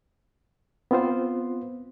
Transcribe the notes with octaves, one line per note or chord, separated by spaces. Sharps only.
B3 C4 F4 C5